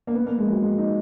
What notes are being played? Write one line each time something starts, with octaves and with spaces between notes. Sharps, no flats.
A#3
B3
A#3
G#3
F#3
G#3
D#4